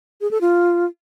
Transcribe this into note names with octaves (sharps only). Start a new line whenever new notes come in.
G#4
A4
F4